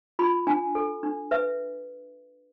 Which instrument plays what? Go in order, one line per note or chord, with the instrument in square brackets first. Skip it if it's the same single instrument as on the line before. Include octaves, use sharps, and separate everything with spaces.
[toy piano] F4 B5
D4 G#5
A4
D4
B4 E5